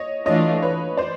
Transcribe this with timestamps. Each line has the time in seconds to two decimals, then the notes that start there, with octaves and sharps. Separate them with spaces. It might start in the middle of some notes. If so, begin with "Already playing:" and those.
Already playing: C#5 D#5
0.26 E3 A3 D4 F4 C#5 D#5
0.62 B4 C#5
0.97 C5 D5